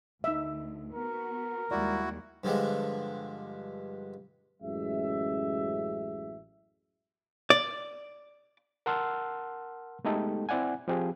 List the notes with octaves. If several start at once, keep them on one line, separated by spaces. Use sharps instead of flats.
D2 D#4 E5
B3 F#4 A#4
D#2 G3 G#3 E4 F#4 D5
G2 D3 F3 G3 G#3
A1 F#2 G#3 E5
D5
A#4 F#5 A5 C6 E6 F6
G#3 A3 B3 D#4 G4 A4
C4 E4 D5 F#5 G#5
F3 C4 G4 G#4